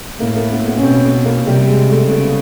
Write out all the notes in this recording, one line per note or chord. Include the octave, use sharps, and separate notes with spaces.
A2 A#3
A#3
B3
B3
C#4
B2 C4
B3
A#3
C3 G3
G#3
A3
C#3 B3